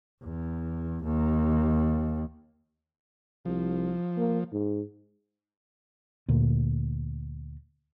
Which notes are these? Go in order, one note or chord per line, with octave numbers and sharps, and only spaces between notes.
E2
D#2
C2 F3
A#3
G#2
D2 A#2